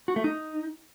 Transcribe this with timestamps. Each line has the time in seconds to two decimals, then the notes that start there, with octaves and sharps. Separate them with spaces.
0.08 F#4
0.16 A3
0.24 D#4